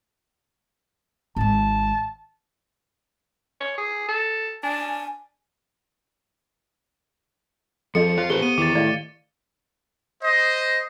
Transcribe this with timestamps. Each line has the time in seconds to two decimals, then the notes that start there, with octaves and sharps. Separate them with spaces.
1.36 G#1 G#3 A5
3.60 C#5
3.78 G#4
4.08 A4
4.63 D4 G#5
7.95 F2 F3 A4 D#5 C#7
8.18 F4 C5 F5
8.30 E3 G4 A4 B4 C5 G7
8.42 B3 D#7
8.58 E2 D#3 D6 A6
8.75 A2 D5 D#5 F5
10.22 C5 D#5